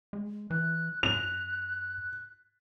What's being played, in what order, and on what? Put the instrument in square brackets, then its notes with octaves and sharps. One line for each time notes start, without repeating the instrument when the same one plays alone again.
[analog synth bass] G#3
[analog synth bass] E3 [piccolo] F#6
[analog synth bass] F#2 [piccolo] F#6 [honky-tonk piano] F7